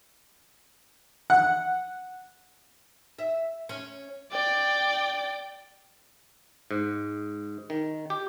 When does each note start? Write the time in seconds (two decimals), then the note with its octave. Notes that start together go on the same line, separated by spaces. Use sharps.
1.30 F#5
3.19 E5
3.69 C#4
4.31 D5 G5
6.71 G#2
7.70 D#3
8.10 G4